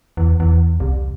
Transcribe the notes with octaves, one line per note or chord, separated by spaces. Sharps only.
E2
E2
C2